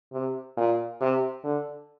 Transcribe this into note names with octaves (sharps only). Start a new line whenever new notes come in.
C3
A#2
C3
D3